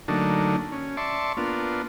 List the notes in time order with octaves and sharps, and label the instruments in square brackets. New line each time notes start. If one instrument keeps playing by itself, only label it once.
[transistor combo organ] D3 F#3 A3 A#3 D4 D#4
C#4
D5 E5 A5 C6 C#6
A#3 B3 D4 F4